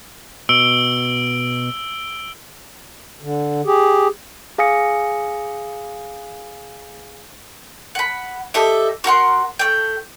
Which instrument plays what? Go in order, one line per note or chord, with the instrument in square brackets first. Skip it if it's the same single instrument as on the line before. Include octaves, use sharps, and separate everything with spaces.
[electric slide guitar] B2 [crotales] E6 D7 G7
[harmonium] D3
G4 G#4
[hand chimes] G#4 F5 G#5 D#6 A#6 C#7
[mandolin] F#5 B5
G4 A4 D#5 E5
F#4 A#4 F#5 C6
A3 G5